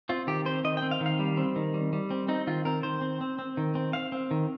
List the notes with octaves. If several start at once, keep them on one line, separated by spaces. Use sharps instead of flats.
C4 F4
D#3 G4
C4 C5
D#3 D#5
G5
C4
F5
D#3
F5
G3
C4
D#3
G3
G3
C4
C4 D#4
D#3 F4
C4 A#4
D#3 C5
C4
C4
C4
D#3
C4
C4 F5
C4
D#3